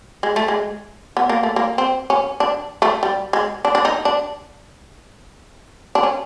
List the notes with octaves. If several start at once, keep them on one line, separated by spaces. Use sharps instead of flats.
G#3
A3
G#3
B3
A#3
A3
A#3
C4
C#4
D4
A3
G3
G#3
D4
D4
D#4
D4
D4
C#4